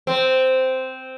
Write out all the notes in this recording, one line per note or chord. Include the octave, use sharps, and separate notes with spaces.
C4